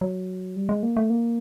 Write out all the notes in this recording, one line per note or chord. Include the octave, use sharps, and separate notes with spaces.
F#3
G3
G#3
A#3
A3
A#3